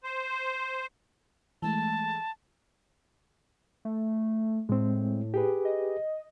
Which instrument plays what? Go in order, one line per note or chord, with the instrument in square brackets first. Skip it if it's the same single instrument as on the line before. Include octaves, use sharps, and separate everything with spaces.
[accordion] C5
[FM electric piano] E3 G#3 A3 [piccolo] A5
[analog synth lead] A3
[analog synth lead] A2 [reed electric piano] G#3 C4
[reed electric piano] G4 G#4 B4
[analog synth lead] D#5